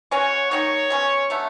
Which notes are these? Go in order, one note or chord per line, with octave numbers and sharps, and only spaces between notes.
G#3 C#4 F#4 C#5
D#3 F#3 A#3 D#4 C#5
B2 G#3 C#4
D3 F#3 A3